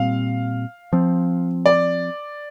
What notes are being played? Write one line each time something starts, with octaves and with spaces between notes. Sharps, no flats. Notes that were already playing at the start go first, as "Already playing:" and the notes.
Already playing: A#2 G3 C4 F5
F3 C4
D5